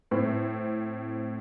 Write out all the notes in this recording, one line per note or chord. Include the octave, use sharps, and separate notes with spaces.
A2 C4